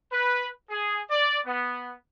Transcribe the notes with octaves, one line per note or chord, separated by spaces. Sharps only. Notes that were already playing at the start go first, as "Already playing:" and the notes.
B4
G#4
D5
B3